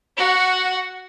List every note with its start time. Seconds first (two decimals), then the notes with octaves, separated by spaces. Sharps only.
0.17 F#4 F#5